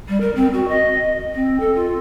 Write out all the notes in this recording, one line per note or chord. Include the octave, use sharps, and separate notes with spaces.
G3
A#4
C4
F#4
D#5
C4
A4
F4